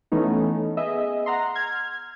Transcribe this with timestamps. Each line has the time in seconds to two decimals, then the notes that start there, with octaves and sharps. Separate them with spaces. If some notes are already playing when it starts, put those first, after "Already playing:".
0.12 E3 A3 B3 C#4 D#4
0.77 B3 G#4 D#5 E5
1.26 F#5 A#5 C6
1.55 F6 G#6